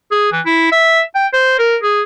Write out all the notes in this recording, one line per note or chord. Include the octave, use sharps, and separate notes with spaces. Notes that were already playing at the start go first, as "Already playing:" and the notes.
G#4
E3
E4
E5
G5
C5
A#4
G#4